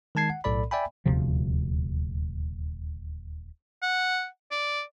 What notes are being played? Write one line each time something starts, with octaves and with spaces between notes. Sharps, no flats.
D#3 G#3 A5 G#6 C7
F#5
B1 A2 A4 D5 B5
D5 E5 G5 G#5 B5
D#1 D2 C3 F3
F#5
D5